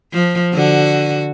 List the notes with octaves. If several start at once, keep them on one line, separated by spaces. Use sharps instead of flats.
F3
D3 F#4